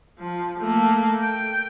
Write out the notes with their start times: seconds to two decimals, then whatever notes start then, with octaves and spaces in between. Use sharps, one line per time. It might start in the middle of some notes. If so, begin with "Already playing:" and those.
0.19 F3
0.59 A3 A#3
1.21 G5